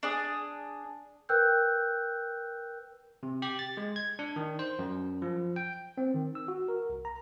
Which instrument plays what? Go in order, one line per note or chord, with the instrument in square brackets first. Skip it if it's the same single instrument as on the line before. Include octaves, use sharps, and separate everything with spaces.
[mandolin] D4 G#4
[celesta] A#4 B4 G5 E6 F#6 G6
[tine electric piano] C3
G4
A6
G#3
G#6
D4
D#3
C5
F#2
F3
G5
C4
D#3
E6
F#4
A#4
C2
A#5